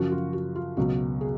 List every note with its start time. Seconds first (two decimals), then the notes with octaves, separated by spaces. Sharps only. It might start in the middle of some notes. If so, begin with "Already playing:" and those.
Already playing: F#2 C#3 F3 F#4
0.11 F4
0.33 F#4
0.55 F4
0.77 C#2 B2 F#3 F#4
1.21 G#4